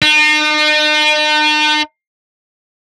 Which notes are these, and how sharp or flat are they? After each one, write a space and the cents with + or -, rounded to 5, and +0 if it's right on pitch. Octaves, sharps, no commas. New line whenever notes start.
D#4 -45